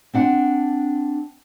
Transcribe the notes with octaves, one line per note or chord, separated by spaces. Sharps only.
C4 D4 F#5